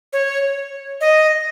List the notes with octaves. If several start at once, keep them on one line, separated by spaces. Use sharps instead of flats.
C#5
D#5